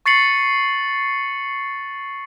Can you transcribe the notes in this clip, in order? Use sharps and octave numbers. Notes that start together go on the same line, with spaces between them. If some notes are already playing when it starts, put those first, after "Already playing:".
C#6 A6 C7 C#7 F#7